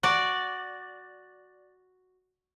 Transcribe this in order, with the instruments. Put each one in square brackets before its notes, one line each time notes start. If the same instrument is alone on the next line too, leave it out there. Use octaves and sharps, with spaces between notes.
[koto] F#4 D5